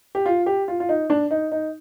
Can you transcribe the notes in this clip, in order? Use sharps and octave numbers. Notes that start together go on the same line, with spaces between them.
G4
F4
G4
F4
F4
D#4
D4
D#4
D#4